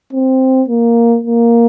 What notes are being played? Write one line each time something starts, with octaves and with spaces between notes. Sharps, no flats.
C4
A#3
A#3